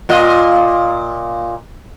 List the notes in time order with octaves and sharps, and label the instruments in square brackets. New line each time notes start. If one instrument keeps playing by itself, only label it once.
[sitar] A#2 F4 D#5